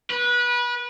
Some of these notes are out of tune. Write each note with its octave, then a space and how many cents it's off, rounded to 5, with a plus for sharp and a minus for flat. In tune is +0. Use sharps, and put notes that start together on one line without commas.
B4 -25